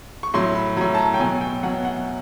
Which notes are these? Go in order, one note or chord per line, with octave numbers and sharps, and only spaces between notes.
C#6
A2 F#3 C6
B5
A2 F#3 A#5
A5
A#5
G5
B2 F#3 G#5
G5
B2 F#3 F#5
F#5